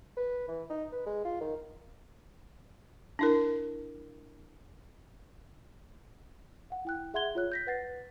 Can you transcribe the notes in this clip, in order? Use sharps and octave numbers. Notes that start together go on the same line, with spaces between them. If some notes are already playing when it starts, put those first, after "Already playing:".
B4
E3
D#4
B4
G#3
F4
D#3
D4 E4 A#4
F5 F#5
E4 G5 F#6
G#4 E5 F#5 C6 G#6 G7
F4 C#5 F#6
G6 A#6 B6
B4 F#5 A6 C7